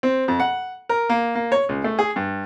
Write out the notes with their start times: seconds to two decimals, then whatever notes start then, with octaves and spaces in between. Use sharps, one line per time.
0.03 C4
0.28 F2
0.40 F#5
0.89 A#4
1.10 A#3
1.35 A#3
1.52 C#5
1.69 C#2
1.84 A3
1.99 G#4
2.16 G2